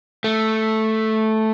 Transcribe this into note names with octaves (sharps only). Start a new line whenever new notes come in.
A3